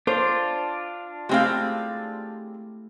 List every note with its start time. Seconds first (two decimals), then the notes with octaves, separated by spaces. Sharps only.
0.07 D4 F4 C5
1.29 G#3 A3 C4 E4 G4 F5